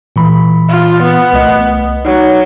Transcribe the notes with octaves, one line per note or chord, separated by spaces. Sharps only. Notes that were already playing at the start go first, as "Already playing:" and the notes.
A#2 E3 B5
F4
B3
C2 A3 D#5
F#3 D#4